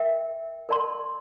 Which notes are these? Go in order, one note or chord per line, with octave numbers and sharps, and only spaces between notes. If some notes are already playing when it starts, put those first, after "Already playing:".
Already playing: A#4 E5 G5
A#4 D5 A5 C6